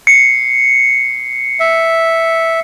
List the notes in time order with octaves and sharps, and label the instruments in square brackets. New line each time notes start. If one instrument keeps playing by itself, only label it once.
[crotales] C7 C#7
[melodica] E5